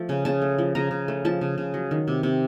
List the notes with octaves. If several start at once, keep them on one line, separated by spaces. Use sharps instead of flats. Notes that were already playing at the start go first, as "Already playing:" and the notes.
Already playing: F3 A3
C#3
C#3 A5
A3
F3
C#3 A#5
C#3
A3
F3 A5
C#3
C#3
F#3
D#3
C3
C3